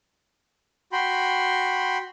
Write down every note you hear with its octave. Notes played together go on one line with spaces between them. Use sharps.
F#4 G5 B5 C6